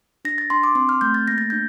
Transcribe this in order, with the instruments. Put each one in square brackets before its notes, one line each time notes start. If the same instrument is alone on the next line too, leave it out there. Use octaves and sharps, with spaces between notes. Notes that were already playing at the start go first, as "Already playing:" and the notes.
[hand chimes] D4 A#6
A6
D4 C6
D6
C4 C6
F6
A3 G6
A6
A#3 A#6
A6
D4 G6